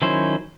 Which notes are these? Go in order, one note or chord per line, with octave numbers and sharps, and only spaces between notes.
D#3 F#3 C#4 E4 C5